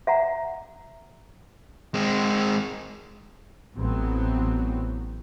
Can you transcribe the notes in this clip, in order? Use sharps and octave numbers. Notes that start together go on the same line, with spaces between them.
E5 F#5 A#5
G#3 C4
A1 E3 F#3 B3 C4